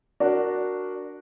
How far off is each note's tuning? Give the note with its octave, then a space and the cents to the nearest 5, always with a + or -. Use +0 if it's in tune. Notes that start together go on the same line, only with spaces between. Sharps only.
D4 +0 F#4 +0 A#4 +0